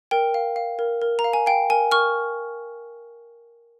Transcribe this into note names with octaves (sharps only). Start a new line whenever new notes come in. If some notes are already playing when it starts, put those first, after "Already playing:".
A#4 G5
F5
F5
A#4
A#4
A#5
F5
G#5
F5 G5
A#4 G#5
A#4 C#6 F6